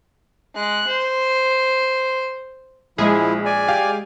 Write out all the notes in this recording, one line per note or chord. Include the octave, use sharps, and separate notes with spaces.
G#3 F#6
C5
A#1 F3 G#3 E4 G#4
D5 G#5
G4 F5 G5